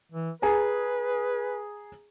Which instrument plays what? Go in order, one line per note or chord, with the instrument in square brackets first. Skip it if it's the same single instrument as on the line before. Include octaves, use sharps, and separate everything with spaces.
[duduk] E3
[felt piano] G#4 G#5 A#5 [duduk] B4